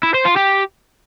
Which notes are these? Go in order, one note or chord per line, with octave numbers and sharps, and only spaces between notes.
E4
C5
F4
G4